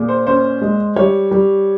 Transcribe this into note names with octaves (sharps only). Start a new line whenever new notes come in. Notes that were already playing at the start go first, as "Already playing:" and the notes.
Already playing: A#2 G#4
C5
C#4 C5
G#3
G3 C#5
G3